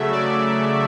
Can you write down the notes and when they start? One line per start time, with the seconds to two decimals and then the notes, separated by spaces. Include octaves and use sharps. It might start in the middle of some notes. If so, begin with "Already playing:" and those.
Already playing: C#3 F#3 A3 E5
0.12 D5